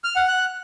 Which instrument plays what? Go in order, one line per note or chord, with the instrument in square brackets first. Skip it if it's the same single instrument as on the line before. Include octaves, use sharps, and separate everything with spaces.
[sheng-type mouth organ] F6
F#5
F#6